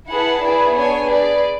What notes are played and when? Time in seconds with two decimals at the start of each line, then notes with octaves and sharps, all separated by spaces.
0.09 E4 G#4 B4 F#5 A5
0.42 E4 G#4 B4 D5
0.75 B3 D4 G#4 C#5 G#5
1.07 G#4 B4 D5